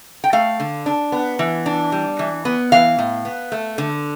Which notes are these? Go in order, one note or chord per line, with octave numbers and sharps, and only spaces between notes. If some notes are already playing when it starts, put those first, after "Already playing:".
G5
A3 F5
D3
D4
B3
E3
D4
G3
E3
B3
E3 F5
A2
B3
A3
D3